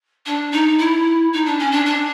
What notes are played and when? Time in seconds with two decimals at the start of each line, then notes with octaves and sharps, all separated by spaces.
0.26 D4
0.52 D#4
0.78 E4
1.33 D#4
1.45 D4
1.59 C#4
1.71 D4
1.85 D4